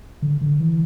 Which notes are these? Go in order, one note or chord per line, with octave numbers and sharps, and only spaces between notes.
D3
D3
E3